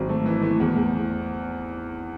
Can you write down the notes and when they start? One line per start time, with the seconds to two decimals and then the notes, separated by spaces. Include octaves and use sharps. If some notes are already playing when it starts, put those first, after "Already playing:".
Already playing: G#1 F#3
0.09 A3
0.26 E3
0.43 A3
0.60 E2
0.76 E2